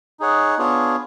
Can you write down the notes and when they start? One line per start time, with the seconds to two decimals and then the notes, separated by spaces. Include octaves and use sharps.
0.20 D#4 G#4 C#5 F#5
0.58 B3 D4 F4 G#4 C#5